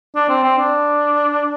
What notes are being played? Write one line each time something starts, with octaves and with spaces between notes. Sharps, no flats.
D4
C4
C4
D4